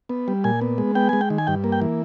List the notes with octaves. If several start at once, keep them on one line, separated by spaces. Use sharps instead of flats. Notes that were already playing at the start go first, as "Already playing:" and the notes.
B3
G3
A#2 G#5
B3
G#3
B3 G5
G#3 G#5
G5
D#3
G#5
G2 G5
A#3
G5
E3